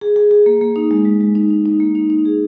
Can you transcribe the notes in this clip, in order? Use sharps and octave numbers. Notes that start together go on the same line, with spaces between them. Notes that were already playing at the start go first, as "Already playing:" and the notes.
G#4
G#4
G#4
A#3
A#3
D#4
G#3
G#3
G#3
D#4
D#4
D#4
A#3
D#4
D#4
G#4